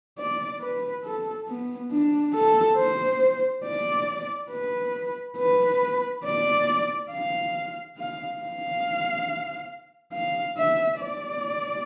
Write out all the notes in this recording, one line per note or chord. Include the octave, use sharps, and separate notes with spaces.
D5
B4
A4
B3
D4
A4
C5
D5
B4
B4
D5
F5
F5
F5
F5
E5
D5